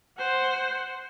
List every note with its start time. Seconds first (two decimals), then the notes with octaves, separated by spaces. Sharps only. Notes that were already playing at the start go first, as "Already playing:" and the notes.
0.18 C5 F#5